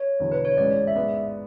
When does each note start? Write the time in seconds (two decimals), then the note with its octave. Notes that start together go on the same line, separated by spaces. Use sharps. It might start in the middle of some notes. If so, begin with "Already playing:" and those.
Already playing: C#5
0.20 E1 E2 D3
0.32 B4
0.45 C#5
0.57 A1 G#2 G#3 C#4 D5
0.87 E5
0.95 G#2 G#3 B3 D5